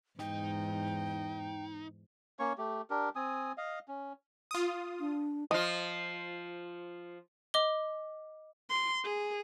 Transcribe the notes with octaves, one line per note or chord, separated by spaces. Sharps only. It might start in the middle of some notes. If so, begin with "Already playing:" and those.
E2 G#2 D#4 G5
A#3 C#4 C#5 C#6
A3 G4
D4 G4 A#4
C4 G#5 D#6
D#5 F5
C#4
F4 D#6
D4
F3 F4 D#5
D#5 D6 G7
C6
G#4